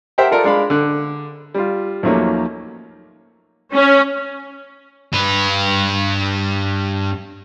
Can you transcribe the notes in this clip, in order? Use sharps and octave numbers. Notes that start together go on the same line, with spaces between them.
G4 A#4 C5 E5 F#5 G5
F4 A4 A#4 D5
G#3 D4 F5 B5
D3 F#6
G3 F4
D#2 F3 F#3 A3 A#3 C#4
C#4
G2 B4